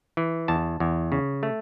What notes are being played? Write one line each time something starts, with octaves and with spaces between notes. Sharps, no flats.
E3
E2 A5
E2
C#3
A3